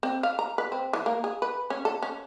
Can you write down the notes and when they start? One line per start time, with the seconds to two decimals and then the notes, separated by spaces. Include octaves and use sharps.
0.03 C4
0.23 F5
0.39 A#5
0.58 B4
0.72 C4
0.93 E3
1.06 A#3
1.24 G#4
1.42 B4
1.70 C#4
1.85 A4
2.02 C#4